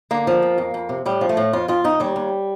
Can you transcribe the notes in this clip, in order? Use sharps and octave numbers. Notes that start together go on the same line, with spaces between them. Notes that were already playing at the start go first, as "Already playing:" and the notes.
D3 A#3
F3
F2
F2
F2
C3
A2 G3
F3
A3
A2
F2 F4
F2 F4
F2 D#4
D#2 G3
D#2